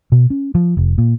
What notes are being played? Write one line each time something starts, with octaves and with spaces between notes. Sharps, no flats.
B2
C#4
F3
F1
A#2